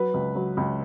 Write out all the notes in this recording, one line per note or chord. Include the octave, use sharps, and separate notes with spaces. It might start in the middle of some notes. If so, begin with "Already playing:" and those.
Already playing: F#3 B4
C#2
F#3
C#2